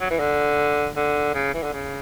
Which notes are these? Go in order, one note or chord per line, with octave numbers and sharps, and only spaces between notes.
F#3
E3
D3
D3
C#3
E3
D3
C#3